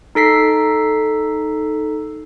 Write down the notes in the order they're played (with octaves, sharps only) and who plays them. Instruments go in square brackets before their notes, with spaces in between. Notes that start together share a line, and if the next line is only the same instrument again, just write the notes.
[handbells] D#4 A4 B6 C7